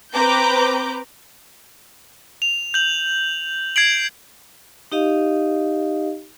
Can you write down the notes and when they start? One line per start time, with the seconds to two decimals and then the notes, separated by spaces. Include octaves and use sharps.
0.14 C4 B4 A#5 D6 G6
2.42 F7
2.74 G6 F#7
3.76 G#6 C7 D7 F#7
4.92 D#4 G4 D#5 F5